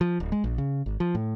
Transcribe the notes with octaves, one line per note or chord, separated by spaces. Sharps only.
F3
D1
G#3
A#1
C#3
G#1
F3
A2